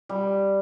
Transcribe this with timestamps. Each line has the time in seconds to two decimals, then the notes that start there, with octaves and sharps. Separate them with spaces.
0.09 G3